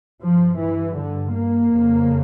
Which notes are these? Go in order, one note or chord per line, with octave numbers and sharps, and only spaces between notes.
G2 F3
E3
D3
A#3
F2 C#3